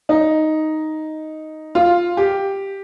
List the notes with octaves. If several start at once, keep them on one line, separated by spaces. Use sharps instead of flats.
D#4
F4
G4